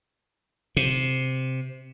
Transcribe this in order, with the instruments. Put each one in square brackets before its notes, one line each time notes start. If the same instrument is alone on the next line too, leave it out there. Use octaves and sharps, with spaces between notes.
[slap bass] C3